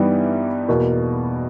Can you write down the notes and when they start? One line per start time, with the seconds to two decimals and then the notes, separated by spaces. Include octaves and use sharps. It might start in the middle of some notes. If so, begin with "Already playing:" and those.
Already playing: G2 E3 G3 B3 D#4
0.69 E2 B2 A#3